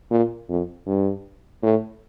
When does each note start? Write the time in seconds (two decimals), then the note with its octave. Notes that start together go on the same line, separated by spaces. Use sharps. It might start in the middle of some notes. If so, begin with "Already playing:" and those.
0.11 A#2
0.49 F2
0.87 G2
1.63 A2